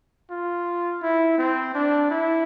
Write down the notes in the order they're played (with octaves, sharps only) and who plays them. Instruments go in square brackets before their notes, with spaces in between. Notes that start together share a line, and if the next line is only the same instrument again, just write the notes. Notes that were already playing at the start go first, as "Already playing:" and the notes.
[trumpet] F4
E4
C4
D4
E4